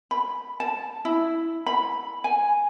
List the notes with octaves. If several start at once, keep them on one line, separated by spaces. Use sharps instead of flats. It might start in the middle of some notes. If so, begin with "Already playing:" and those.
B5
A5
E4
B5
G#5